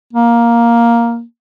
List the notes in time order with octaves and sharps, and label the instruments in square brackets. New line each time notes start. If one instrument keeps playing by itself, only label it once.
[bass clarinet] A#3